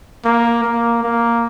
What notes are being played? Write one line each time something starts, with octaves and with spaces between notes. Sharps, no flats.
A#3
A#3
A#3